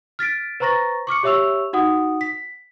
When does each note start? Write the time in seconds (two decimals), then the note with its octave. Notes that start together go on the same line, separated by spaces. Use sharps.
0.19 F6 A6 B6 D7
0.60 B4 C5 A#5 C#6 A6 A#6
1.07 C#6 D6 F6 C#7
1.23 G4 C#5 E5 C#6 E6 F7
1.73 D#4 F#4 F#5 D#6
2.21 B6